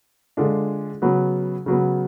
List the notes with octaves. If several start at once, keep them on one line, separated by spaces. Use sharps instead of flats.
D3 G#3 D4 F4
C#3 F#3 B3
C#3 F#3 B3